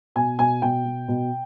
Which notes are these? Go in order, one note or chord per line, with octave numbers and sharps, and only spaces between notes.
B2 G#5
B2 G#5
B2 G5
B2
B2